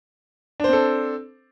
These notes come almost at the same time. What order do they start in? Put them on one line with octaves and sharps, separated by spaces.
D4 C5 C4 A4